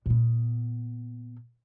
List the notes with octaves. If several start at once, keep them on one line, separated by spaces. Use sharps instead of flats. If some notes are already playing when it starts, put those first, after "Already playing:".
A#2 B3